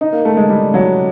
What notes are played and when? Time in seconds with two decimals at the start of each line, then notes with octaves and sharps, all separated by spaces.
0.01 D#4
0.12 A#3
0.25 A3
0.37 G#3
0.49 G3
0.74 F#3